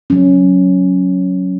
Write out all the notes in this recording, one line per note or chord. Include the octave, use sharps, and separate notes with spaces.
F#3 C#4